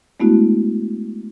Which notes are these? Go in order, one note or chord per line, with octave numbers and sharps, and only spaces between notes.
G#3 A3 B3 D4 E4 F#4